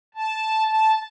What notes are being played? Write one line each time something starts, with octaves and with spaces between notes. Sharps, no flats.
A5
A5